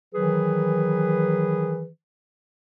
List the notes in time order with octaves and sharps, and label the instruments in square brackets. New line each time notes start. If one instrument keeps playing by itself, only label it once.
[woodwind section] D#3 E3 F#3 G#4 B4